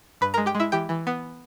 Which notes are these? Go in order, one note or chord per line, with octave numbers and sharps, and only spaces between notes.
G2 B4 B5
A#4 A#5
G#3
G4 G5
G#3
E4 E5
E3 G4 G5
E3
B3